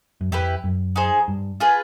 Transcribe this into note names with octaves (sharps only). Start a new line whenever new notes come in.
F#2
F2 E4 G4 B4
F#2
D#4 G#4 C5
G2
F4 G#4 B4